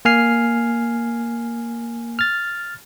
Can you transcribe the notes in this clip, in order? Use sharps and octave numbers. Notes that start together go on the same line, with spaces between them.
A#3 G#5 F6 C7
F6 A6